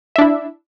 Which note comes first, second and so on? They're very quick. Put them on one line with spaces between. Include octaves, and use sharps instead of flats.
E5 D4 E4